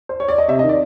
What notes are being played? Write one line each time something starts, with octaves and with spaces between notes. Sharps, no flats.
C5
C#5
D5
D#5
C3 E5
D#5
D#3
D5